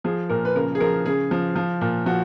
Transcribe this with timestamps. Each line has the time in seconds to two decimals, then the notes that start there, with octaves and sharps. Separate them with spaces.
0.04 F3 G#4
0.29 A#2 A#4
0.45 B4
0.55 C#3 A#4
0.75 G#4
0.80 F3 A#4
1.06 C#3 G#4
1.31 F3
1.56 F3
1.81 A#2
2.06 F3 F#4